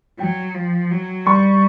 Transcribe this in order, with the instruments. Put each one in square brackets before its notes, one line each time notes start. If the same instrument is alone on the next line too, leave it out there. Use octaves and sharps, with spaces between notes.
[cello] F#3 [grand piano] G5
[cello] F3
F#3
[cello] G3 [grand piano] C#6